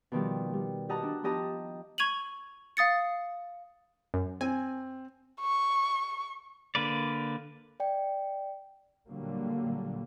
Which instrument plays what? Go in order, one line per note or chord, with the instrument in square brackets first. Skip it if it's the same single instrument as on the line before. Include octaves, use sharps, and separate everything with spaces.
[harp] B2 D#3 F3 G3
G3
F#4 G4 D#5 F#5 A5 A#5
D4
F3 B3 G4 D#5 A5 A#5
[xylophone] C#6 G#6 D#7 F7 F#7
F5 D#6 A6 C#7
[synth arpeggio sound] F#2
[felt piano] C4 [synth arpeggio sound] G#5
[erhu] C#6
[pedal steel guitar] D3 A#3 B4 D5
[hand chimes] D5 G5
[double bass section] A#2 D3 F#3 G3 A#3